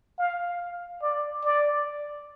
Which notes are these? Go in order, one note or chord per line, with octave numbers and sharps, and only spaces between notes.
F5
D5
D5